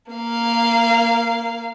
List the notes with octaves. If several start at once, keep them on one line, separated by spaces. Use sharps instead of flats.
A#3 F5